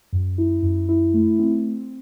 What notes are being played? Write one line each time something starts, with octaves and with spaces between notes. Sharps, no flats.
F#2
E4
F#2
E4
A3
C4